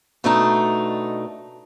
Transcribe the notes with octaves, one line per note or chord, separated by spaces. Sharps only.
B2 A3 D4 D#4 A4